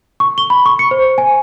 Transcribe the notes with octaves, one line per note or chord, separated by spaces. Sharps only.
C#6
G7
B5
C#6
C#7
C5
G#5